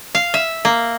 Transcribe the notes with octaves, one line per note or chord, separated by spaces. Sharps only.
F5
E5
A#3